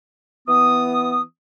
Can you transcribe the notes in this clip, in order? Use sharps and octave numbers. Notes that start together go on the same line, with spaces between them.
E3 B3 D#6